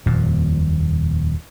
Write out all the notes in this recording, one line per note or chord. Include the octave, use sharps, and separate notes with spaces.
D#1 F2 A#2